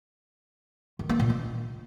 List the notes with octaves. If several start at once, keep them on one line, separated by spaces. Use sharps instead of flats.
D#3
A#3
A#2
D#3